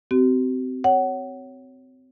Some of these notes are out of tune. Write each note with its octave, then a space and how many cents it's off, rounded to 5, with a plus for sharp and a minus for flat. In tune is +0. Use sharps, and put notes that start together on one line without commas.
C4 -25 F#4 +45
C#5 +0 F#5 +25